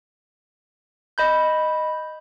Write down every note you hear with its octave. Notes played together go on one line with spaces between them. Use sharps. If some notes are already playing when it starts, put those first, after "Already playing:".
D#5 B5 G6